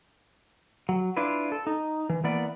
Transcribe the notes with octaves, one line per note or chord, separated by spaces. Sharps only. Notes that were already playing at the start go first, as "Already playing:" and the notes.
F#3
D4 E4 F4 B4
A4
D#4
E3
E3 A#3 B3 D5